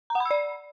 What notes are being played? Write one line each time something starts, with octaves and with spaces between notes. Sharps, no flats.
A#5
F#5
B5
E6
D5